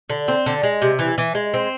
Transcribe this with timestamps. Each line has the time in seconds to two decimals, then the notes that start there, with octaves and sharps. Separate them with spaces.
0.10 D3
0.28 C4
0.46 D3
0.63 G#3
0.82 C3
0.99 E3
1.18 E3
1.35 G#3
1.54 C4